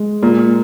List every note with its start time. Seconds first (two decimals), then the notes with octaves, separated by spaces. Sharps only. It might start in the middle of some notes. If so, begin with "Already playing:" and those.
Already playing: G#3
0.23 A#2